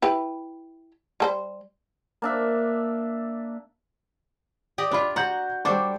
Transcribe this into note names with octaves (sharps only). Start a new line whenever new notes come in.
E4 G4 B4
G3 A4 C5
A#3 D4 E5
G4 D5 D#5
D4 F4 D5 B5
F#4 F#5 A#5 G6
G3 D4 A4 C5 C#6 D6